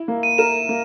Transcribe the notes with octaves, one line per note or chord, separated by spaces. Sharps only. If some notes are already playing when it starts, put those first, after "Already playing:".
Already playing: E4
A#3
D#7
A#4 E7
A#3